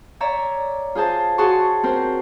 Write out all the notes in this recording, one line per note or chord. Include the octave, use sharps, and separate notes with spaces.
C#5 D5 E5 A#5
F4 G#4 C5 A5
F#4 G#4 A5 C6 C#6
C4 A#4 C5